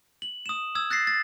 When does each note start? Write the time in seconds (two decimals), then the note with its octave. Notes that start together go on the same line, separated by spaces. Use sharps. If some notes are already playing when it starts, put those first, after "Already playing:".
0.22 F#7
0.46 D#6 E7
0.75 D#6 E6 G#6
0.90 F#6 A6 A#6 C7
1.07 A6